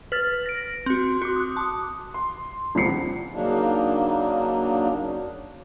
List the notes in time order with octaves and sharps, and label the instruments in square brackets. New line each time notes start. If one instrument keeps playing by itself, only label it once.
[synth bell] B4 F6 A6
A#6 D7
C4 F#4
F#4 C6 D6
D#6 F#6
A5 D6 D#6
[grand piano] C6
D#1 C2 F3 C7 C#7
[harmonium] C#3 F#3 A#3 D4 D#4